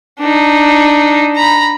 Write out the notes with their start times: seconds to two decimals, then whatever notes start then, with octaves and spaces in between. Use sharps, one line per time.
0.19 D4 D#4
1.36 A#5 B5